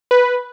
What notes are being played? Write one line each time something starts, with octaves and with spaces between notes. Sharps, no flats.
B4